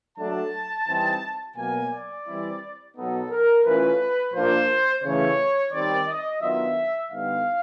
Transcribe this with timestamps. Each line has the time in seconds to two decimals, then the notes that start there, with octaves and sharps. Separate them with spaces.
0.18 F#3 A3 D4 A5
0.87 E3 G3 C4 D#4
1.57 B2 F#3 A#3 G#5
1.91 D5
2.26 E3 G3 C4 E4
2.96 B2 F#3 B3 D#4 A4
3.30 A#4
3.64 E3 A3 C#4 F4 B4
4.33 A#2 F3 A#3 D4 F4 C5
5.03 C#3 E3 A3 C#5
5.72 D#3 G3 C4 D5
6.08 D#5
6.42 D#3 F#3 B3 D4 F4 E5
7.11 D3 G3 B3 D#4 F5